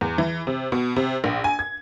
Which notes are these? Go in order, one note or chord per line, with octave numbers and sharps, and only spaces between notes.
E2
E3
C3
B2
C3
A#1
G#5
G#6